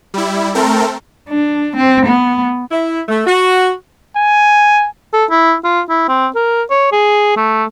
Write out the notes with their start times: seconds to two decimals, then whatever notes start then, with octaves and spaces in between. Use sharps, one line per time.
0.14 G3 E4
0.55 A3 C4 A4 A#4
1.29 D4
1.76 C4
2.06 B3
2.71 E4
3.08 A3
3.26 F#4
4.17 G#5
5.13 A4
5.30 E4
5.64 F4
5.89 E4
6.08 C4
6.35 A#4
6.70 C#5
6.92 G#4
7.36 A3